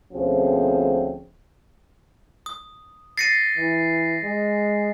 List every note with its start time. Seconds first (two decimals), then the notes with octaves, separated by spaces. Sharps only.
0.13 D2 B2 F3 C4 C#4 G#4
2.46 D#6
3.18 A6 A#6 C7 C#7 D#7
3.57 E3
4.23 G#3